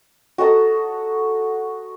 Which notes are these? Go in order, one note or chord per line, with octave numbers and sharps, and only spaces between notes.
F#4 A4 D#5 A#5